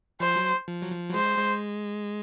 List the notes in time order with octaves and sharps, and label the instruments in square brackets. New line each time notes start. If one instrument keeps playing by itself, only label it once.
[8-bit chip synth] F3 [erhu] C5
[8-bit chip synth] F#3
F3
F#3
F3
F#3
[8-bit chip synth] G#3 [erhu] C5
[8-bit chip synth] G#3